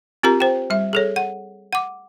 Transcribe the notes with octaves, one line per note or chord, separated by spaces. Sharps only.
C4 F4 G4 A#4 A#5
C5 G5
G3 E5
G#4 A4 C#5
F#5
F#5 D6